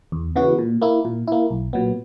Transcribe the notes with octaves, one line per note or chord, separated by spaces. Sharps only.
E2
C#3 E3 B3 F#4
A#2
A#3 E4
A#2
A#3 E4
B1
A#2 F#3 B3